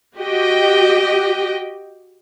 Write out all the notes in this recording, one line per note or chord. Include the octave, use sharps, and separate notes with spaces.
F#4 G4 D#5 G5